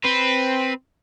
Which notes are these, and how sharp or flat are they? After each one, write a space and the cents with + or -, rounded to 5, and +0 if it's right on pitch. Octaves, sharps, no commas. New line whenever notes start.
C4 +0 B4 +0